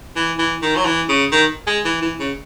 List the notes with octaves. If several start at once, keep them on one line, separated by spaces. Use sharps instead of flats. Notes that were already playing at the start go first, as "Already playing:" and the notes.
E3
E3
D#3
F#3
E3
C#3
D#3
G#3
E3
E3
C#3